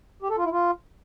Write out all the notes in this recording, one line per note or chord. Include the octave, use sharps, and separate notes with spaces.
G4
A4
F4
E4
F4